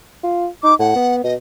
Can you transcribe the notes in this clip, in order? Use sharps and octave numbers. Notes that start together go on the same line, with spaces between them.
F4
D#4 D6
A2 F#5
B3
B2 D#5